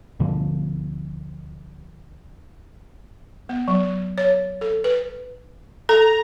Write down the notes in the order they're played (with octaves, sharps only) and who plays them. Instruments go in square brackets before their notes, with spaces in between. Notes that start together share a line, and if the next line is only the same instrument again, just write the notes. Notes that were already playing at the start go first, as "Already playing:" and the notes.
[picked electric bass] D2 B2 D3 F3
[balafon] B3
F#3
C#5
A4
B4
[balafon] A4 [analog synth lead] A#5